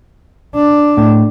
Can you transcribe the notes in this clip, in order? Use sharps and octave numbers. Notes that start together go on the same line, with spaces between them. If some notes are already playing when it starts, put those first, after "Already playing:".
D4
A2